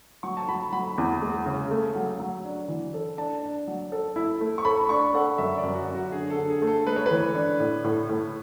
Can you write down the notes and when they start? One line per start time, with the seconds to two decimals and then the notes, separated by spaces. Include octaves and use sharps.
0.23 F#3 C#6
0.37 A5
0.48 F#3 B5
0.72 F#3 B5
0.98 E2
1.22 G#3
1.46 C#3
1.71 A3
1.95 F#3
2.20 F#3
2.44 D4
2.68 E3
2.94 A4
3.18 D4 A5
3.43 D4
3.67 F#3
3.92 A4
4.16 E4
4.41 A3
4.58 C#6
4.65 A4 B5
4.89 D4 C#6
5.14 A4 F#5
5.38 F#2 E5
5.57 D5
5.63 F#2
5.75 F#4
5.88 F#2
5.95 F#4
6.12 D3 G#4
6.30 A4
6.37 D3
6.50 G#4
6.62 A3
6.67 A4
6.86 G#3 B4
6.96 C#5
7.06 E3 B4
7.35 D4
7.60 A2
7.84 A2
8.09 A2